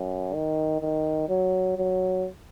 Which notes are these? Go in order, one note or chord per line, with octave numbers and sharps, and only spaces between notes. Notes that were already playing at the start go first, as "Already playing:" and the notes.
Already playing: F#2
D#3
D#3
F#3
F#3